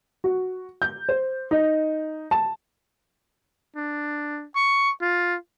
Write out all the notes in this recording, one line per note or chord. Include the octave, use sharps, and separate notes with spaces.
F#4
G6
C5
D#4
A5
D4
C#6
F4